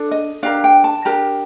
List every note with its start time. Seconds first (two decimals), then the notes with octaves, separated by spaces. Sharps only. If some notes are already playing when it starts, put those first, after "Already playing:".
Already playing: D4 A4
0.11 D#5
0.43 D4 G4 A#4 F5
0.64 G5
0.84 A5
1.05 D4 G4 A#4 A#5